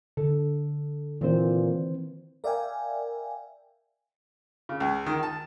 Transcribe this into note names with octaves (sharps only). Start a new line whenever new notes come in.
D3 A4
A#2 D#3 E3 C4 C5
A#4 D5 E5 F5 G5 G#5
C#3
C#2
D#3
A5